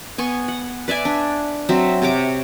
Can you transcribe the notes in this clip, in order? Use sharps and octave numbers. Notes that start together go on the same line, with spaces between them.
B3 G#5 C#6
F#5
B4 D5 E5 G#5
D4
F#3 C4 E5
C3 C#5 D6